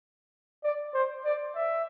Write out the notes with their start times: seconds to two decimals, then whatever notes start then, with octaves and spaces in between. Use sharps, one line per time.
0.64 D5
0.94 C5
1.25 D5
1.56 E5